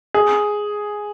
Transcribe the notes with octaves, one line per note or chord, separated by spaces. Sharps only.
G#4